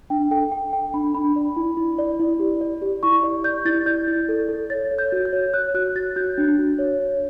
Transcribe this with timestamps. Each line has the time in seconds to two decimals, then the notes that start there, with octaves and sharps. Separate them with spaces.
0.10 D4 G5
0.31 A4 G5
0.52 A4 G5
0.73 A4 G5
0.94 D4 B5
1.14 D4 B5
1.36 D5
1.56 E4
1.77 E4
1.98 D5
2.19 E4
2.40 G4
2.61 D5
2.82 G4
3.03 E4 C#6
3.24 D5
3.44 D5 G6
3.65 E4 A6
3.86 D5 G6
4.07 E4
4.29 A4
4.49 A4
4.70 C#5 A6
4.91 C#5
4.98 G6
5.12 F#4
5.25 G6
5.33 C#5
5.54 C#5 F#6
5.75 F#4 F#6
5.96 F#4 A6
6.16 F#4 G6
6.38 D4
6.58 F#4
6.79 C#5
7.00 C#5